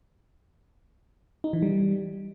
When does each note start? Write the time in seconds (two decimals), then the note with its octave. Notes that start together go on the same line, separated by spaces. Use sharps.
1.44 D#4
1.53 E3
1.62 G3